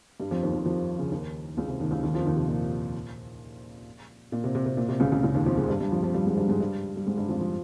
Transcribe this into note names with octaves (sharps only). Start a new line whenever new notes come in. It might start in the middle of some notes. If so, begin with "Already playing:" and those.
G2 G3
F2 F3
D#2 D#3
F2 F3
F2 F3
C#3
D#2 D#3
C#2 C#3
C3
D#2 D#3
C#2 C#3
D#2 D#3
F2 F3
D#2 D#3
C3
A#2
A#2
C3
C3
C3
A#2
C3
C#2 C#3
C#2 C#3
C#2 C#3
D#2 D#3
F2 F3
G#2 G#3
G2 G3
G2 G3
F2 F3
F2 F3
G2 G3
G#2 G#3
G2 G3
G#2 G#3
G2 G3
G3
G#2 G#3
G2 G3
F2 F3
F3